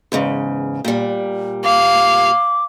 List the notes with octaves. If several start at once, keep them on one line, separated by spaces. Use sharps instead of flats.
E2 G#2 C#3
A#2 G3
F5 D6